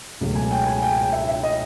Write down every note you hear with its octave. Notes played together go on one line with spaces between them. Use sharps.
C#2 B2 F#3 A3
G#5
G5
G#5
G5
G5
E5
E5
D#5